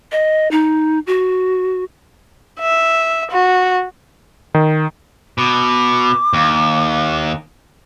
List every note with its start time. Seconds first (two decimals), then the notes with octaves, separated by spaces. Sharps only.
0.12 D#5
0.51 D#4
1.07 F#4
2.61 E5
3.31 F#4
4.55 D#3
5.38 B2 D6
6.33 D#2